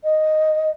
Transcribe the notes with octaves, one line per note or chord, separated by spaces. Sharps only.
D#5